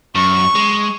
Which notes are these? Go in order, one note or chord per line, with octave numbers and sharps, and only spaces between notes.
F#2 C#6
G#3